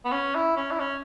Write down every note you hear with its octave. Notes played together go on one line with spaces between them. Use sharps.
B3
C#4
E4
C#4
E4
C#4